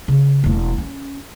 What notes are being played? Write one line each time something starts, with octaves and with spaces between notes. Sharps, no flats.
C#3
E1 A3
C#4